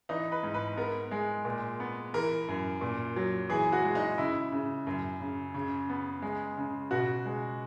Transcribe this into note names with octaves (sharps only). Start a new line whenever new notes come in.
E3 D#4
B4
G#2
B4
B3 A#4
G#3
A#2
B3
E3 A#4
F#2
A#2
F#3
E3 G#4
F#4
G#3
D#4
C#3 E4
C#3
F#2
C#3
C#3
B3
G#3
C#3
B2 F#4
G#3